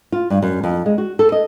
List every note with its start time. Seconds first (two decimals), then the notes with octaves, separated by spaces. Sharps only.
0.12 F4
0.30 G2
0.42 F#2
0.64 F2
0.86 G#3
0.98 F#4
1.19 A4
1.32 D#5